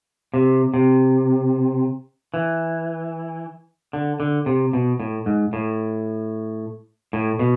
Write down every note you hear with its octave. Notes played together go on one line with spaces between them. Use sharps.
C3
C3
E3
D3
D3
C3
B2
A2
G#2
A2
A2
B2